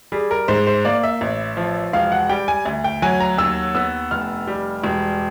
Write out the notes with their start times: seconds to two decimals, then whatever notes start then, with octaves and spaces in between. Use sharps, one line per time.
0.12 G3 G#4
0.31 A#4
0.48 G#2 C5
0.67 C5
0.85 A#3 D5
1.03 E5
1.21 A1
1.57 F3
1.93 E1 F5
2.12 F#5
2.29 G3 G5
2.48 G#5
2.66 D2
2.84 G5
3.02 F#3 G#5
3.20 A#5
3.38 D#2 E6
3.75 B3 E6
4.11 F1 F6
4.47 G3
4.84 E1